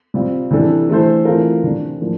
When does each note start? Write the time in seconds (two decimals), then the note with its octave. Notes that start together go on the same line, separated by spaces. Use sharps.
0.14 C3 G3 C4 F4
0.51 C3 E3 G3 D4 A4
0.89 E3 A3 D4 A4 C5
1.25 E3 A3 C4 F4 A#4
1.63 C3 G3 D4
2.01 A2 F3 A#3 D4